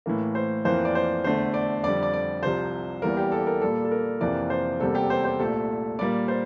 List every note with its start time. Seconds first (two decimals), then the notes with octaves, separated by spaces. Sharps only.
0.06 A2 E3 A#3
0.35 C5
0.65 F2 E3 A#3 C5
0.85 D5
0.95 C5
1.24 E2 D3 A3 C5
1.54 D5
1.83 F2 D3 G3 D5
2.03 D5
2.13 D5
2.42 C2 C3 F3 C5
3.02 E2 E3 G3 A#3 A#4
3.17 G4
3.32 A4
3.47 A#4
3.61 A#2 G3 A#3 A4
3.85 A4
3.91 A#4
4.21 F2 C3 E3 A#3 D5
4.50 C5
4.80 E2 C3 G3 A#3 A4
4.95 G4
5.10 C5
5.25 C5
5.39 C2 A#2 A3 A4
5.99 A#2 G3 A#3 D5
6.28 C5